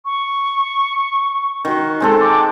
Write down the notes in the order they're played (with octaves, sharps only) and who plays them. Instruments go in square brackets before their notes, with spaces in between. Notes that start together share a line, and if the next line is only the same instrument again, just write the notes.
[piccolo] C#6
[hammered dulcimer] D#3 F#4
G#3 C4 A4
[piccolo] D6